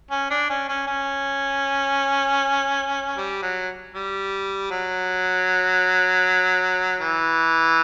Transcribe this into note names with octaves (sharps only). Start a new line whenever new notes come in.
C#4
D4
C#4
C#4
C#4
G3
F#3
G3
F#3
E3